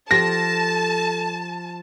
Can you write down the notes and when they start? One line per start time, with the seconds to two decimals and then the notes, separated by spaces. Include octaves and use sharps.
0.11 F3 G4 A4 A5 A#6